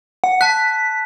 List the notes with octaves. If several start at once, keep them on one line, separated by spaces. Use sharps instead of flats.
F#5
A5 F#6 B6